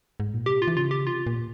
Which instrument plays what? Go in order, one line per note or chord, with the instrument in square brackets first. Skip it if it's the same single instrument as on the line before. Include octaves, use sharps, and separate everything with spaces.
[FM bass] G#2
A#2
[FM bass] C3 [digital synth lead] G4
[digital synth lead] F4
[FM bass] E3
[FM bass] C#3 [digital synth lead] F4
[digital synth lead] G4
[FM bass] C3 [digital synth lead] F4
[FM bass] A#2